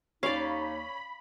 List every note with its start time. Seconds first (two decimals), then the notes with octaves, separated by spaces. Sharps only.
0.23 D#2 C#4 D#4 D5 F5 B5